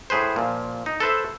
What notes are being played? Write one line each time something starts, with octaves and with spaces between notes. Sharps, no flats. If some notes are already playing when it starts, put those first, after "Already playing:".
A2 G#4 B4 C5
A#2 F3
D#4
A4 B4 C5 E5